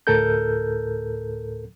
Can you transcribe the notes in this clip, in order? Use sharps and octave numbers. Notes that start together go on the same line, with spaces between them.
D2 A2 A4 A#4 G6